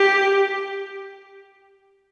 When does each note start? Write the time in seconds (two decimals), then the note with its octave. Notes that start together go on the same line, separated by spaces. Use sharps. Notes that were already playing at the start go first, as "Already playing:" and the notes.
Already playing: G4